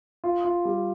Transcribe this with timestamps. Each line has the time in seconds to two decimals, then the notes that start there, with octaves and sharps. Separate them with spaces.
0.24 F4
0.45 F4
0.65 G3